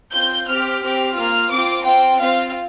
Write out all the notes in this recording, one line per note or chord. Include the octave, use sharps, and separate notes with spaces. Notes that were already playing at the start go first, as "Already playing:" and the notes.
C4 F4 G6
C4 G4 F6
C4 G4 F6
A#3 F4 F6
C4 F4 D6
C4 F4 G5
C4 F4 F5